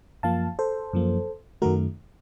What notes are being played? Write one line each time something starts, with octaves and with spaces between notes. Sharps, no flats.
F#2 F3 A#3 F5 A5
A4 C5
F#2 F3 A#3
F#2 D#3 F#3 A3 F#4 A#4